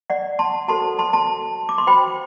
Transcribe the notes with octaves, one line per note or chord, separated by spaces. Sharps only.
D5 F#5
A5 C6
F#4 A4 C5 A5 C6
A5 C6
A5 C6
D6
C6
F#4 C5 G5 B5